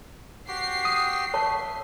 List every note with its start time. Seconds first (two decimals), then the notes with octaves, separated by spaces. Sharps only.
0.48 F#4 G4 G5 C7
0.85 D#6
1.34 C#5 E5 A5 C#6